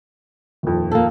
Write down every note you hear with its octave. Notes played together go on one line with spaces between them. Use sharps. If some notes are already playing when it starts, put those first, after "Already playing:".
D#1 F2
A#3 A4